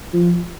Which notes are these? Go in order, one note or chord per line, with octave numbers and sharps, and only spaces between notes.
F3